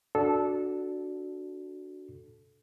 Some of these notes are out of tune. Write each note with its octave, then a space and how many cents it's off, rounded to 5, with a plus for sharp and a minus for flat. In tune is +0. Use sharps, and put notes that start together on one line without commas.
D4 +0 F#4 +0 A4 -15